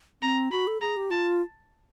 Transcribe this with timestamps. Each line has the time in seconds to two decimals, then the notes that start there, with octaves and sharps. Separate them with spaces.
0.22 C4 A#5
0.52 F#4 B5
0.67 A4
0.81 G#4 A#5
0.97 G4
1.10 F4 A5